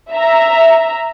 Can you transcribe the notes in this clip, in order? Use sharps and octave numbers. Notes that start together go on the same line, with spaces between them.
E5 A#5